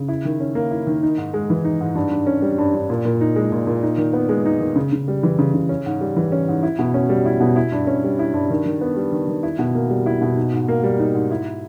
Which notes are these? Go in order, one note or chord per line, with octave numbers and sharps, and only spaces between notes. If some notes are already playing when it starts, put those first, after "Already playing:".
Already playing: C#3
E4
D#3
C#4
A#3
E4
D#3
D#4
G#2
G#3
E3
D#4
G#2
G2
G2
C#4
G3
G2
G2
A#2
A#2
D#4
G#3
A#2
A#2
D#4
D#3
B3
G#3
D#4
D#3
C#3
C#3
G3
E3
C#3
C#3
C#4
G#2
G3
E3
C#4
G#2
E4
B2
C#4
G3
E4
B2
E4
G2
C#4
G3
E4
G2
D#3
D#3
B3
G3
D#3
D#3
E4
B2
A#3
G3
E4
B2
D#4
G#2
A#3
G3
D#4
G#2
E4